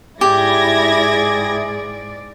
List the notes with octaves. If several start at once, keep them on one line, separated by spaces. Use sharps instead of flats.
G#2 E4 G4 G#4 D5 G#6 A#6